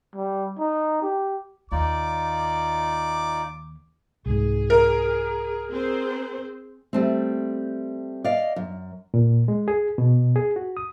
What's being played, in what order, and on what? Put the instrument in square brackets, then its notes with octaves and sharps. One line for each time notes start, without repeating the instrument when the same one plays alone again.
[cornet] G3
D#4
G4
[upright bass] D#2 [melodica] D#4 F4 D5 [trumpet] D6
[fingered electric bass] C2 G#2 [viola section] G#4
[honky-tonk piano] A#4
[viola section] C4 G#4 C5
[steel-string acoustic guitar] G3 A3 C4
D5 D#5 F5
F#2
[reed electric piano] A#2
G#3
G#4
B2
G#4
F#4
D#6